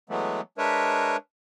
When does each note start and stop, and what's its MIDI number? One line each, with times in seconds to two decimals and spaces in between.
0.10 0.41 52
0.10 0.41 54
0.10 0.41 56
0.10 0.41 57
0.10 0.41 59
0.58 1.16 56
0.58 1.16 62
0.58 1.16 70
0.58 1.16 71
0.58 1.16 73
0.58 1.16 76